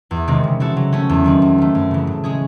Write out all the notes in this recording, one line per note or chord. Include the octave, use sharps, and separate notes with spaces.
E2
C3 D#3 G#3 C4
C#3
E3 C4 F#4 A4
F#3
A3 C#4
E2
D#3 F#3 C4
E2
D#3 A3
F#2
C#3 E3
A2
G#3 C#4 G#4